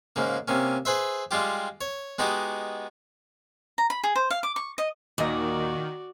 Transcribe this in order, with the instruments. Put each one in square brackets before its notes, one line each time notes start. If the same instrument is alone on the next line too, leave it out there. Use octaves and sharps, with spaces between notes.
[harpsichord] G#2 C#3 A#3
C3 A#3 C#4
G#4 B4 C5 E5
G3 G#3 F4 G4
C#5
G#3 B3 D#4 F#4 G4
[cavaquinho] A#5
B5
G#4
C5
F5
D6
C#6
D#5
[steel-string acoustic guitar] D#2 [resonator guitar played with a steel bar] A#2 D#5 [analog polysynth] D#3 [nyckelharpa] F#4 D5